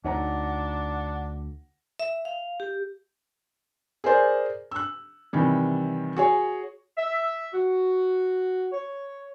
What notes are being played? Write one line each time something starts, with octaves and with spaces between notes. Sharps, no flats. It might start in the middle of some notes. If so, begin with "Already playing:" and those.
D2 D4 D#4 C#5 F#5 A#5
E5
F5
G4
G#4 A#4 C5 D5
E6 F#6
C3 D#3 E3 G3
F#4 G#4 C#5
E5
F#4
C#5